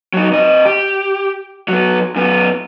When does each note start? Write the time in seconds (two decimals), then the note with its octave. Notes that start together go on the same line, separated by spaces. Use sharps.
0.14 F#3 D#4
0.31 C3 D#5
0.65 G4
1.68 F#3 B3
2.16 F#2 B3